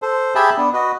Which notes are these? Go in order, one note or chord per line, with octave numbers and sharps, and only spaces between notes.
A4 C5
G4 G#4 E5 G5 A5 B5
B3 D4
F#4 B4 D#5